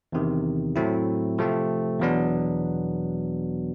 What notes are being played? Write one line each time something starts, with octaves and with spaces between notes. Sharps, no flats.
E2 C3 D#3
A2 F#3 A3 C4 E4
C3 F3 A3 C4
E2 B2 F#3 B3 D4